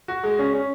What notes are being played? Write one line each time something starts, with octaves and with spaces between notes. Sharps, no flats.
F#4
G#3
C#4
C#4